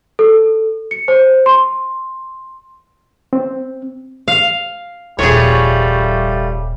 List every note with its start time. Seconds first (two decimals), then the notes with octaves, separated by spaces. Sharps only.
0.19 A4
0.91 C#7
1.08 C5
1.46 C6
3.33 C4
4.28 F5
5.19 D#1 C2 F3 G3 A3 G#4 C#5